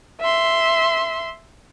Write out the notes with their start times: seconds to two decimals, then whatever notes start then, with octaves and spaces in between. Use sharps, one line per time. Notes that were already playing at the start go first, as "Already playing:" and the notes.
0.21 E5 C6